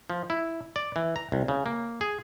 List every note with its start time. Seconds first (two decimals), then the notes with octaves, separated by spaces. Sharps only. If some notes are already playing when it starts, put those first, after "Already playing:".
0.10 F3
0.30 E4
0.76 D5
0.96 E3
1.16 A#5
1.32 C2
1.48 C#3
1.66 A#3
2.01 G#4